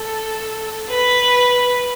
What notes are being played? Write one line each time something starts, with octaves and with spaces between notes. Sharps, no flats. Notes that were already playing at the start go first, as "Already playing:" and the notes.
Already playing: A4
B4